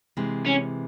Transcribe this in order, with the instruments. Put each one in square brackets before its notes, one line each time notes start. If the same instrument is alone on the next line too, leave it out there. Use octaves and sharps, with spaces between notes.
[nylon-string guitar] C3 E3 G#3
[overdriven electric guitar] C#4